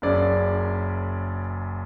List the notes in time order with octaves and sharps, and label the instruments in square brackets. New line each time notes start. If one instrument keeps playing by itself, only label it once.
[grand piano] F#1 F#2 C#3 D5